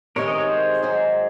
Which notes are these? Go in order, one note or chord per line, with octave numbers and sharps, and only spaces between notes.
C3 D#3 G#3 A#4 C#5
D#5
C#5
G#4 C5
G#2 D#3 F#3